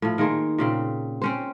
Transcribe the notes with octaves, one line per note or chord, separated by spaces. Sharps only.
A2 F3
D#3 A#3 G#4 C5
A#2 C#3 C4
C4 C#4 C5